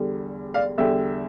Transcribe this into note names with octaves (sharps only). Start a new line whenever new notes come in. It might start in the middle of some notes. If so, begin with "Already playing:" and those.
Already playing: E2 D3 G3
D5 F5
E2 D3 G3 E5 G5